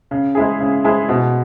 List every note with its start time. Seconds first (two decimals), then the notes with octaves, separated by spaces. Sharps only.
0.11 C#3
0.35 G#3 E4 G#4
0.60 C#3
0.84 G#3 E4 G#4
1.09 B2